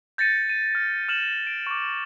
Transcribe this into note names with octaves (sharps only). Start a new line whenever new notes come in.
G6 A6 A#6 C#7 D#7
D#7
F6
F6 E7 F#7
D7
C#6 D6